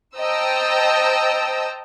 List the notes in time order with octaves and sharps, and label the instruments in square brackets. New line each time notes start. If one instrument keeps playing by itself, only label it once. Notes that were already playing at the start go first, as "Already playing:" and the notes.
[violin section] C5 D#5 G5 A5 A#5 E6